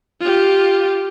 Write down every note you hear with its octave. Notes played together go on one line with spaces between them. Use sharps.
F4 G4